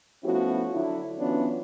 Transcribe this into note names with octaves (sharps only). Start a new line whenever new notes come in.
F3 A3 B3 C#4 E4 F#4
D3 F#3 D4 E4
E3 F#3 B3 C#4 D4 F4